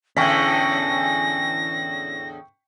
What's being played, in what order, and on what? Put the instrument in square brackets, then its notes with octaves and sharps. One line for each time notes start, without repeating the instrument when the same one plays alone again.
[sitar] E2 A2 D3 [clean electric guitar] C#4 [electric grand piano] G5 C#6 B6 [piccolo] A#6